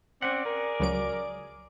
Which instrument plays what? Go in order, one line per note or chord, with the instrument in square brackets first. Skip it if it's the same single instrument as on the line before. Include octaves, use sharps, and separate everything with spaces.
[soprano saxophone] C4 [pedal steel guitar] C#4 F#5 [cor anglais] D5
[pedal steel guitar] G#4 [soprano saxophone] A#4
[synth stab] C#2 F#3 D7